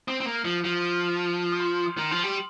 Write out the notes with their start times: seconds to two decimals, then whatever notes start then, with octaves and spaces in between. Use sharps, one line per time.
0.08 C4 D#6
0.20 C4
0.27 A#3
0.45 F3
0.64 F3
0.84 F6
1.52 D#6
1.60 C6
1.86 D#6
1.97 D#3
2.11 F3 C6
2.24 G3